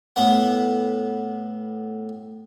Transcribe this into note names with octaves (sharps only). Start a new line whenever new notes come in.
A2 B3 F#5